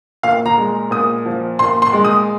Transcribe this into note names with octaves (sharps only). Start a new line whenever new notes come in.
A#2 F5
A#5
G#3
A#2 D#6
F3
A#2 C6
C6
G#3
D#6